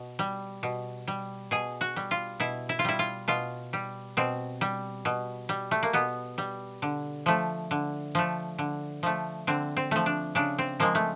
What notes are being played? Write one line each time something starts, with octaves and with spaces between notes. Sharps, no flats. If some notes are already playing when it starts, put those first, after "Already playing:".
Already playing: B2
G3
B2
G3
B2 G#4
F#4
G3
F4
B2 E4
E4
F4
G3 E4
F4
B2 F4
G3
B2 C4
G3
B2
G3
A3
A#3
B2 B3
G3
D3
F3 A3
D3
F3 A3
D3
F3 A3
D3 C4
C4
F3 A3
D4
C#3 D4
C4
F3 G#3 A#3
A3